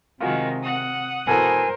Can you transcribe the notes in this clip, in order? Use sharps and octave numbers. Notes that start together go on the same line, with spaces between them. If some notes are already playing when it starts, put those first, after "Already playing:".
C3 D#3 G#3 F4 F#4 A#4
F#5 D#6
B2 E3 A4 A#4 C5 G#5